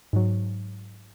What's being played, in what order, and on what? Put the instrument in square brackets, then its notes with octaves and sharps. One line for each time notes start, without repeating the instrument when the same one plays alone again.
[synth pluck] G#2 F#3